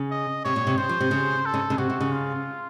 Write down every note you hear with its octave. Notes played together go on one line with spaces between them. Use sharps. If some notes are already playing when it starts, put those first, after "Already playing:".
Already playing: C#3
D#5
C3 C#5
A#2
C3
C#3 C5
F3
C3
C#3
A4
C#3
C#3
C3 F#4
C3
C#3
F4